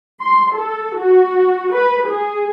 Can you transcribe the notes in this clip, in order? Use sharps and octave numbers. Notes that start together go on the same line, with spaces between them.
C6
A4
F#4
B4
G#4